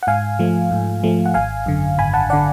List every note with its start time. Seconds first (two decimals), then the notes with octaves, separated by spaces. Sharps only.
0.03 F#5
0.07 G#2 F5 G#5
0.39 F3 A3
0.71 G#2
1.03 F3 A3
1.26 F#5
1.34 G#1 F5 G#5
1.66 F#2 D3
1.98 G#1 G#5 B5
2.14 F#5 A5
2.30 D3 D5 F#5